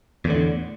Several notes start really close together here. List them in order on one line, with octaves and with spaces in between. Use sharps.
E2 A2 D3